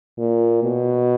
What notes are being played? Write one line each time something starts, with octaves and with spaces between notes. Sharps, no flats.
A#2
B2